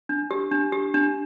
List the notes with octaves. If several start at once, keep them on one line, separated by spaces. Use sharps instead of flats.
D4
G4
D4
G4
D4